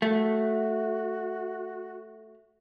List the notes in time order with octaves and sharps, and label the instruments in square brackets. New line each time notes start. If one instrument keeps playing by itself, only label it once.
[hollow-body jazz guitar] A3 [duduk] F#4